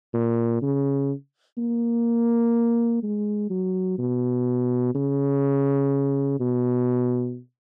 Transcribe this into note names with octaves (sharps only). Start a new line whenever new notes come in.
A#2
C#3
A#3
G#3
F#3
B2
C#3
B2